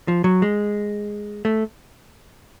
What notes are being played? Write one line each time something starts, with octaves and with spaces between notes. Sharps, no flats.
F3
F#3
G#3
A3